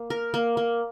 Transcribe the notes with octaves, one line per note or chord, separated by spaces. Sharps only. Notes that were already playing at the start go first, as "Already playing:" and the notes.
Already playing: A#3
A#4
A#3
A#3